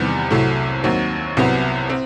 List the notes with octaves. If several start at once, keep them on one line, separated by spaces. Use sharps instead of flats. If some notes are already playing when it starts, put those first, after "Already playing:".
Already playing: E2 C3 D#3 G3 B3
C2 C3 F#3 A3 E4
D#2 D#3 F#3 C4
C2 C3 F#3 B3
C4